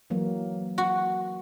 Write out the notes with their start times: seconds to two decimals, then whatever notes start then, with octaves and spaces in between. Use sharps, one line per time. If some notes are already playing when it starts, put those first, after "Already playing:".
0.10 E3 F#3 A#3
0.78 F#4